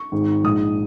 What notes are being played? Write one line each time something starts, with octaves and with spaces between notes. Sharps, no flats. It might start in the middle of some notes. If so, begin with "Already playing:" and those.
Already playing: C#6
G#1 G#2 G#3 D#4
A#1 G#2 G#3 D#6